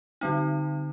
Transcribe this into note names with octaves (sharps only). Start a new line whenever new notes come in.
D3 G3 C4 D#4